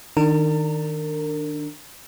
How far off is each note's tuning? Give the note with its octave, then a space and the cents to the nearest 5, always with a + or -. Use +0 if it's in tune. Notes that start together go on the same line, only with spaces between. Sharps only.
D#3 +0 D4 +10 A#4 -35